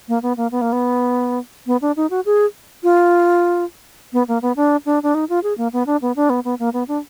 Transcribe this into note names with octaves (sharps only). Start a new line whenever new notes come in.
A#3
B3
A#3
B3
A#3
B3
B3
D4
D#4
F#4
G#4
F4
B3
A#3
B3
D4
D4
D4
D#4
F4
G#4
A#3
B3
D4
B3
D4
B3
B3
A#3
B3
D4